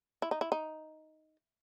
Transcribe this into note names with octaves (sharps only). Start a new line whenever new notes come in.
E4
D#4
E4
D#4